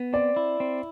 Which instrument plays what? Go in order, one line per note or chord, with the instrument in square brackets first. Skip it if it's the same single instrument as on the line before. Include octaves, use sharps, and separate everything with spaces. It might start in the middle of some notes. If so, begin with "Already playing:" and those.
Already playing: [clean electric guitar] B3
[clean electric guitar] C4 [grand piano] D5
[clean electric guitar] E4
C4